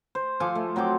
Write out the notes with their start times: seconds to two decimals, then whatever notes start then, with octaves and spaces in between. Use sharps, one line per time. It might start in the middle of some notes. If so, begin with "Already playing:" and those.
0.15 C5
0.40 F3 A4 G#5 D6
0.55 A3
0.76 F#3 C4 G5 D6